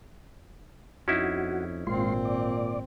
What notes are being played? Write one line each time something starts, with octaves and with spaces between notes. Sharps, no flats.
F2 C#4 D#4 E4 F#4
G#1 A#2 G#3 C4 F4 C6
D5